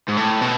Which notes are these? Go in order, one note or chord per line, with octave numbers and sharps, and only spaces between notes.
G#2
A2
B2